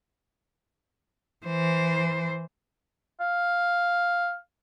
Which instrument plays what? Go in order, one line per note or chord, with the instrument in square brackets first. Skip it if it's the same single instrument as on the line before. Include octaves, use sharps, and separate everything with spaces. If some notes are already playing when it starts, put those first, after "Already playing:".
[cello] E3 C5
[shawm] F5